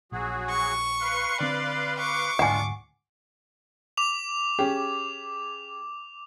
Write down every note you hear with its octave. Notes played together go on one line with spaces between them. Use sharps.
A#1 F#3 F#4 G#4
C#6
B4 F5 C6
D3 C4 D5
C#6 D6
D2 G#2 G#3 D4 F4 F#5 G#5
D6 F7
C#4 G4 G#4